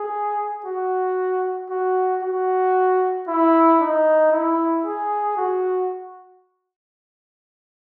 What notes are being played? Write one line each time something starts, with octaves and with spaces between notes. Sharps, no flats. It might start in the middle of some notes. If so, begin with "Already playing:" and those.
Already playing: G#4
F#4
F#4
F#4
E4
D#4
E4
G#4
F#4